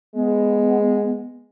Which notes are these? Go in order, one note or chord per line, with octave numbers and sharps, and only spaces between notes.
G#3 B3